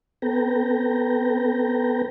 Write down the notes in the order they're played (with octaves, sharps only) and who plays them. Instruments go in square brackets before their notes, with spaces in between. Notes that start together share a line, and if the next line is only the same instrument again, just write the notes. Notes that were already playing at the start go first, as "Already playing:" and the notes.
[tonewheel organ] B3 C4 A4 B4 G5 A#5